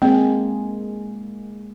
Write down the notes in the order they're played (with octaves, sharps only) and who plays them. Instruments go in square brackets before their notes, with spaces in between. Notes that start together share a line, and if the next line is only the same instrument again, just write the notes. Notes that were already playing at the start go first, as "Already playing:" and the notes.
[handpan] G#3 A#3 G#4 [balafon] C4